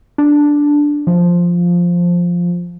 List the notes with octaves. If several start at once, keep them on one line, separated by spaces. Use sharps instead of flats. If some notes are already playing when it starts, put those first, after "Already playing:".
D4
F3